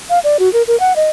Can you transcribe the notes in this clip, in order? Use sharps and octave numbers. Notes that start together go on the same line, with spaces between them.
F5
D5
F#4
A#4
A#4
F#5
D#5